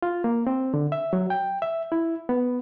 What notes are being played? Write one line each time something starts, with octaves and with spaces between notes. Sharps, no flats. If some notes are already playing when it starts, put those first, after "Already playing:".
F4
A#3
C4
D3
E5
F#3
G5
E5
E4
B3